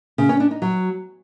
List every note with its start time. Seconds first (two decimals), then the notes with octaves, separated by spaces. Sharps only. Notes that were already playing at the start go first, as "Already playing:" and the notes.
0.18 C#3
0.29 C#4
0.40 D4
0.51 D#4
0.62 F#3